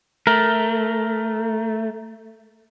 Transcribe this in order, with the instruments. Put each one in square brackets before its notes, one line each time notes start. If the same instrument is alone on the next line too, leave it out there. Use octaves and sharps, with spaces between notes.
[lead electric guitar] A3 [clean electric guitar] A#4